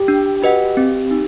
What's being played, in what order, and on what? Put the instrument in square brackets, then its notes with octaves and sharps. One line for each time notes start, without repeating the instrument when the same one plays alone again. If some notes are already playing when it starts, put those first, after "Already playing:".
Already playing: [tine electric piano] G4
[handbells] D4
F#4 B4 D#5 F#5
C4
D#4